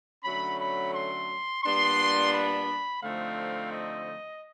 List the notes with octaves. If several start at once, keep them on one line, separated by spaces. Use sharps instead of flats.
D3 F#3 A3 C#4 B5
B5
C6
A#2 G3 B3 D4 C6
B5
D3 F3 A3 C4 D#4 F5
D#5